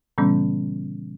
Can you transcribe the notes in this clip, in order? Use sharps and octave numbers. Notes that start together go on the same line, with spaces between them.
A#2 C#3 E3 G3 B3 C#4